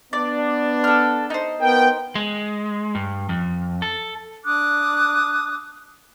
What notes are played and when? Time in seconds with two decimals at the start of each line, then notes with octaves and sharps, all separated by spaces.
0.13 B3 D4 D5
0.84 A4 F6
1.30 D#4 C5
1.61 B3 A#4 G5
2.15 G#3
2.95 G2
3.29 F2
3.82 A4
4.44 D4 D6 D#6 F#6